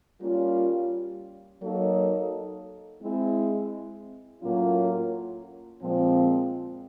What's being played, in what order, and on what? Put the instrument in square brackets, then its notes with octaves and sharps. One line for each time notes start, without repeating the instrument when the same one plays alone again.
[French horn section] G3 A#3 C#4 F4
F#3 A#3 D#4 F#4 A4
G#3 C4 E4
A2 F#3 A#3 C#4 F4
A#2 F3 G#3 C4